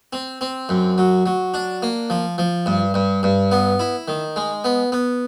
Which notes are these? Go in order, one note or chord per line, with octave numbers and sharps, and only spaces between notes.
C4
C4
F#2
F#3
F#3
D4
A#3
F3
F3
G2
G2
G2
B3
E4
D#3
G#3
B3
B3